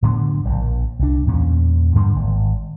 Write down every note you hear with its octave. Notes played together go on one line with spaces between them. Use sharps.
A2 D3 F#3 B3
E1 A#1
C2 D4
E2 A#2 C#4
G2 D3 G3 A#3
G#1